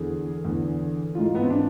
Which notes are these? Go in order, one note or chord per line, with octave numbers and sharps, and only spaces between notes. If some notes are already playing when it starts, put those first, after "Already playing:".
Already playing: E2 D3 G#4
E2 D3
G#2 E3 F4
B3
C4
D4